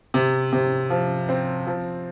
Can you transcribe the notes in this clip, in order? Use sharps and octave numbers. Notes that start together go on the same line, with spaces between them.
C3
C3
F3
C4
F3